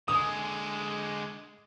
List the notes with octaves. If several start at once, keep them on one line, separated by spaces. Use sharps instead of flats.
D3 G#3 D#6